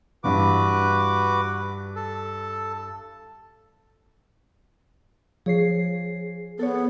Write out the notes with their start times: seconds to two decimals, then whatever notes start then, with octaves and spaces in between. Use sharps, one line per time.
0.24 G2 E3 F#4 B4 D6
1.96 A4
5.46 F3 G#4 C#5 C7
6.59 B3 A4 C#5